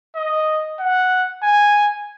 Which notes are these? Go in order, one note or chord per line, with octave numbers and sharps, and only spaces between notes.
D#5
F#5
G#5